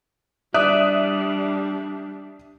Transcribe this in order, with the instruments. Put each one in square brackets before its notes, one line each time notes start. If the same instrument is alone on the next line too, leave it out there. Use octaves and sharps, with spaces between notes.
[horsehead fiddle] G3 D4 [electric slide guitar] D5 [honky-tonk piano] E5 D#6 F#6